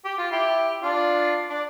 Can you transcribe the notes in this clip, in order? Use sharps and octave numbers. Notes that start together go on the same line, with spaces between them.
G4
F4
E4 G4
D4 F4
D4